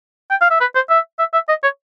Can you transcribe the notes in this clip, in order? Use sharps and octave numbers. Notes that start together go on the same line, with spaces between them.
G5
F5
E5
B4
C5
E5
E5
E5
D#5
C#5